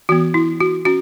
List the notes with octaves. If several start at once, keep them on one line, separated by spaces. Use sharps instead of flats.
E3 B3 F#4
E4
F#4
C#4 F#4